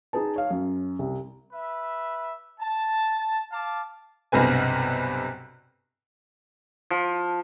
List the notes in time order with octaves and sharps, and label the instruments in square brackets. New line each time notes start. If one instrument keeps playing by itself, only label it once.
[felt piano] D#4 G#4 B4 A5
C#5 F5
F#2
C2
[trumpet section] B4 E5
A5
F5 A5 D6
[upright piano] B1 G2 C3 B4 G#5
[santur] F3